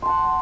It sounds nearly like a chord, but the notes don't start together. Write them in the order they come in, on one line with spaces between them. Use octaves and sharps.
C6 A5 F#5